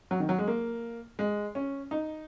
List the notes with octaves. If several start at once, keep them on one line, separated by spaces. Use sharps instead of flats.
F#3
D#3
F#3
G#3
A#3
G#3
C#4
D#4